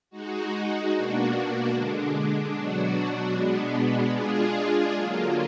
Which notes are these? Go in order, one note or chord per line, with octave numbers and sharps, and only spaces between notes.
G#3 D#4 F#4
B2 A#3 D4 F#4
D3 G#3 D4
B2 F#3 D4 F#4
B2 G#3 B3 D4
G#3 D4 F4 G#4
D3 F#3 A#3 F4